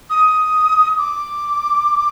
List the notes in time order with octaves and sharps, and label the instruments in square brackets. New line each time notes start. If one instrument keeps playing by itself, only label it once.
[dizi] D#6
D6